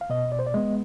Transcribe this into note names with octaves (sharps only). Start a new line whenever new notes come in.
F5
B2 D#5
D5
C5
D5
G#3 B3 D#5